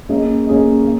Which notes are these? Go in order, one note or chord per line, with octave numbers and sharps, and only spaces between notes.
A#3 C#4 G#4 D#5
A#3 C#4 G#4 D#5
A#3